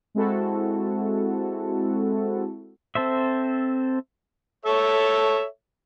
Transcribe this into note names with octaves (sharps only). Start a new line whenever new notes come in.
G#3 C4 E4 F#4 A4
C4 A4 C5 E5
A4 C#5 E5